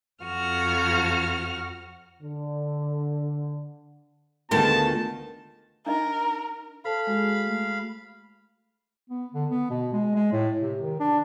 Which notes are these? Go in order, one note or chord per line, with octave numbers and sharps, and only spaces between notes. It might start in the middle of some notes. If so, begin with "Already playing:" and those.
F2 F#4 F6
D3
D2 D#3 G#3 B3 F4 A4 A5
D4 D#4 A#4 D#5
A4 C5 F5 A5 B5
G#3 F#4 G#4
A3
B3
D3
B3
B2
G#3
G#3
A2
C3
D#3
D4